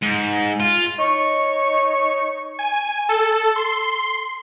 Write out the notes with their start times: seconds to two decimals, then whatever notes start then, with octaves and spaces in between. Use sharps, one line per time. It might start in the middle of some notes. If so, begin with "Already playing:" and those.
0.02 G#2
0.60 F4
0.99 D#4 C#5 C#6
2.59 G#5
3.09 A4
3.56 C6